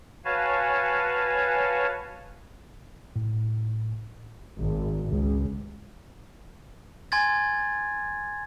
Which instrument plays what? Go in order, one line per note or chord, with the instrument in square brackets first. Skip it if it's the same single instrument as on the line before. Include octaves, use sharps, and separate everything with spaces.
[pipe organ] F#4 B4 C#5 F5 G#5 A5
[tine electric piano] A2
[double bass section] G#1
C#2
[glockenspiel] G#5 C6 G#6 A6